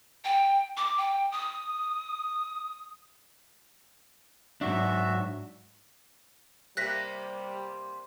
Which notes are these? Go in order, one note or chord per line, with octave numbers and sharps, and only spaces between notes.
G5
D6
G5
D#6
G#2 F#3 D4 F#4 E5
C3 G3 A#3 C4 F#6 A#6 B6